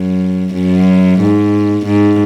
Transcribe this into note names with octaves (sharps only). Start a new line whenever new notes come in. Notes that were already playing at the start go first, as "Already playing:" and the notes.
Already playing: F#2
F#2
G#2
G#2